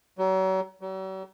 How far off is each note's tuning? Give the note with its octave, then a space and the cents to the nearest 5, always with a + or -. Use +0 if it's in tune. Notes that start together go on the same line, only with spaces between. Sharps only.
F#3 +40
F#3 +45